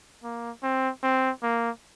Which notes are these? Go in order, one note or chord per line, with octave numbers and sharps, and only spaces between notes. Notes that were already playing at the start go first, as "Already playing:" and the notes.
A#3
C4
C4
A#3